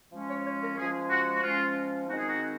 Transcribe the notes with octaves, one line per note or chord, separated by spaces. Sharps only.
F3 G#3 C#4
C#5
C#5
A#4
F3 G#3 C#4 G#4
F#4
F#4
F3 G#3 C#4 F4
D#3 G#3 C4 D#4 F#4
G#4
F#4